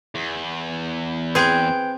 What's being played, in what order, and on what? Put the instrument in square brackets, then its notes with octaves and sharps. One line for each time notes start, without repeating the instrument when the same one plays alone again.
[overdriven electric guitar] E2
[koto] C4 G#4 [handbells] B4 G5 G6